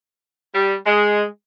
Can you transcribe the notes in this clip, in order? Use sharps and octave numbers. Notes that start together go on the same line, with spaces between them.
G3
G#3